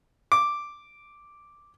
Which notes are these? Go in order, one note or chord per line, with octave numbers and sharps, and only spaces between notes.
D6